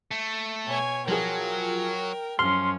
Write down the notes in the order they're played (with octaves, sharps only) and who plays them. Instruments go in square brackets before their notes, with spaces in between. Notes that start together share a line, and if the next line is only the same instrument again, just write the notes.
[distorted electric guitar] A3
[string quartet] B2 C#5 G#5
[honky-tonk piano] F3 F4 G#4 [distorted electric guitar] F#3 [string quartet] A#4 G5
[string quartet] F#2 F3 C#4 [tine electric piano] C6 [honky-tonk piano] F6